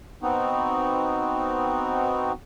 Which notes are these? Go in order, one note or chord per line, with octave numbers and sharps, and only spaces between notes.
B3 C4 D#4 F#4